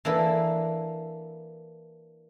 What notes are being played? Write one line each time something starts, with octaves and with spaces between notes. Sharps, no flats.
E3 A#3 D4 A4 B4